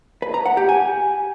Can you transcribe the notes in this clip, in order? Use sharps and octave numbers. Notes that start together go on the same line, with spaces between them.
B4
A#5
F#5
G4
G#5